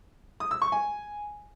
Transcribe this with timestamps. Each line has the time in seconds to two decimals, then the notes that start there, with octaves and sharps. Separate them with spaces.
0.40 D#6
0.51 E6
0.62 C#6
0.72 G#5